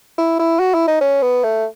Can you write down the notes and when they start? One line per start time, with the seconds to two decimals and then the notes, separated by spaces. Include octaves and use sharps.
0.18 E4
0.39 E4
0.60 F#4
0.74 E4
0.88 D#4
1.01 C#4
1.22 B3
1.44 A3